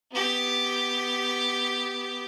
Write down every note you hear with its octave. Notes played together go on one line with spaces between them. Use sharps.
B3 G4